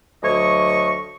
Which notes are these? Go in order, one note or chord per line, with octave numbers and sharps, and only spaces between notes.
D2 F#3 D#5 C#6